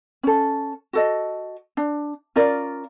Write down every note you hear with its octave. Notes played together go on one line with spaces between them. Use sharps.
C#4 A4
F#4 A4 D#5
D4
C#4 F4 A#4 D5